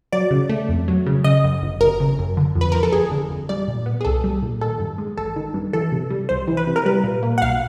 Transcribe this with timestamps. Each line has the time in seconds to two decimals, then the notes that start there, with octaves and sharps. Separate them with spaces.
0.12 F#3 D5
0.31 C#3
0.49 A3
0.69 F2
0.88 F#3
1.06 C#3
1.24 C#3 D#5
1.44 F#2
1.63 G1
1.81 G1 A#4
2.00 C#3
2.19 F#2
2.37 D3
2.55 F2
2.61 B4
2.72 F3 A#4
2.83 A4
2.93 G1 G#4
3.11 D3
3.30 F2
3.49 G3 D5
3.68 A#2
3.86 B3
4.01 G#4
4.05 C2 A4
4.24 G3
4.43 A#2
4.61 D#3 A4
4.80 G2
4.98 G#3
5.17 A1 A4
5.36 D#3
5.54 G2
5.73 E3 A4
5.92 C3
6.10 G3
6.29 C2 C5
6.48 E3
6.57 B4
6.67 C3
6.76 A#4
6.86 G3 B4
7.04 A#2
7.23 A#3
7.38 F#5
7.42 B1 F5